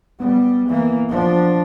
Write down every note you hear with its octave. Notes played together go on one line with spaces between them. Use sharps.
G3 B3
E3 A#3
F3 D4